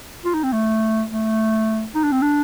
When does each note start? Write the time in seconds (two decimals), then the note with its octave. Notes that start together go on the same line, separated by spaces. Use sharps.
0.25 F4
0.34 D#4
0.43 C4
0.53 A3
1.10 A3
1.95 D#4
2.04 D4
2.12 C4
2.22 D4